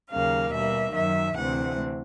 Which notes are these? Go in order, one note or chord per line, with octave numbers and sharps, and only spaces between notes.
D#2 C#3 F#3 A#3 F5
B2 G3 A#3 E5
F#2 D#3 F#3 E5
D2 C3 E3 A3 C4 F#5